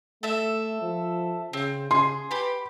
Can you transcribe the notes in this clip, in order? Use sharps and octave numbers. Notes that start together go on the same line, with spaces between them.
A3 A4 E5
F3
C#3 C4
C#3 G#4 C6
G4 B4 B5